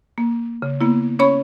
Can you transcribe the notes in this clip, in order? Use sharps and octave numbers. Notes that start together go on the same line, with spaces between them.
A#3
C#3
A#3 B3 E4
C#4 C#5 B5 C#6